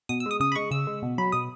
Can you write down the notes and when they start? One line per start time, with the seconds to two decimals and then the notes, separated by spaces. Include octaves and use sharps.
0.09 B2 D#6
0.20 E6
0.26 G#3 D#6
0.40 C#3 D#6
0.52 B5
0.55 G#3 C#6
0.71 C#3 E6
0.87 G#3
1.02 B2
1.18 F#3 B5
1.32 B2 D#6